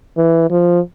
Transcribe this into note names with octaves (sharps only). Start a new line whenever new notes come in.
E3
F3